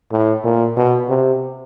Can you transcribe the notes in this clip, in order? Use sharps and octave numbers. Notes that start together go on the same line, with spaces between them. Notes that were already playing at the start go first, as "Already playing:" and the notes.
A2
A#2
B2
C3